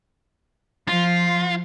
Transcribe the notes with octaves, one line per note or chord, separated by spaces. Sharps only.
F3 F4